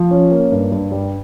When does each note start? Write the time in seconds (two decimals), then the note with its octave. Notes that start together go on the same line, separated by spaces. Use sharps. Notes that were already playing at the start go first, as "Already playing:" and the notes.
Already playing: F3
0.11 C#4
0.31 A#3
0.52 G2
0.72 G2
0.92 G3